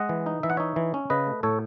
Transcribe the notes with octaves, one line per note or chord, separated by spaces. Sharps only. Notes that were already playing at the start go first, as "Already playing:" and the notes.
Already playing: G#3 D#5 F#5
E3
D#4
E3 E5
F#5
D#4 C#5 E5
E3
C#4
C#3 B4 D#5
A3
A2 A4 C#5